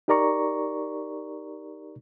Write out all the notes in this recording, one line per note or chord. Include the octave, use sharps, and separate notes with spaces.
D#4 G4 A#4 D5 A#5 C#6